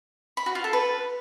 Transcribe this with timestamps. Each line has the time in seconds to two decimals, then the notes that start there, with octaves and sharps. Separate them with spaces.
0.37 B5
0.46 F#4
0.55 F4
0.64 A4
0.73 B4